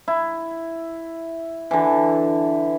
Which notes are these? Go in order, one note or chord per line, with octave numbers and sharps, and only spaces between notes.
E4
D3 E3